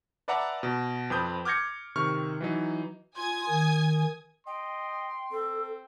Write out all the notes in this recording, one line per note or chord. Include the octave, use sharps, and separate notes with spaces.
B4 D5 E5 F#5 A5 A#5
B2
F2 C4 B4 D#6 G6
D6 F6 G6 G#6 A#6 C#7
C3 D#3 C#6 F6
E3 F#3 D#4
F4 G#5 D#6 G#6
D#3
D#5 G5 C6
C4 A4